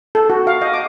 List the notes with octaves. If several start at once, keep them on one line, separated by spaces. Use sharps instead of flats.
A4
F#4
F5
D#5
D6